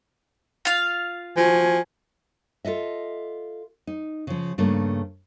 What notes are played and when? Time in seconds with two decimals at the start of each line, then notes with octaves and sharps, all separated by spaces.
0.65 F4 F5
1.37 F3 F#4 G#5
2.65 F4 A4 D#5 E5
3.87 D#4
4.27 C#3 F3
4.58 G2 C#3 A3 A#3